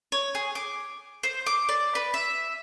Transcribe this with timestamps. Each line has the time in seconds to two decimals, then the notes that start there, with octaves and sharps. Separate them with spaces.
0.12 C#5
0.35 G#4
0.55 D6
1.23 C5
1.46 D6
1.69 D5
1.95 B4
2.14 E5